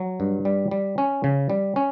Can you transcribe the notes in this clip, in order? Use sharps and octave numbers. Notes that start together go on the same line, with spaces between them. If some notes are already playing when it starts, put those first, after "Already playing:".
Already playing: F#3
G2
G3
G3
C#4
C#3
G3
C#4